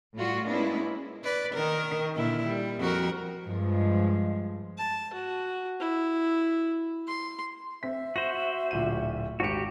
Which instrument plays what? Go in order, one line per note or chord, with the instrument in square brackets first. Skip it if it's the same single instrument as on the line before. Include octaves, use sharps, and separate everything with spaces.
[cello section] A2 G3 F4 F#4
G#3 A#3 B3 C#4 D4 E4
[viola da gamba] B4 D5
D#3 A#4
A#2 D3 E4
G3
F2 F#4 A#4
[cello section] G2 F3 G#3
[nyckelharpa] A5
F#4
E4
C6
[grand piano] C4 B6 [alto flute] E5
[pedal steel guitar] F#4 C5 [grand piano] A#6
[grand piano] D1 A#2 D#7
[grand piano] G#1 C#7 [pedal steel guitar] F#4 G4